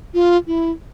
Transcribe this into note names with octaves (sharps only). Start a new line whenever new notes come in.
F4
E4